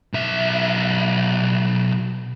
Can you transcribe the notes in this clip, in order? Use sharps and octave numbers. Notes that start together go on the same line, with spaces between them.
B1 E5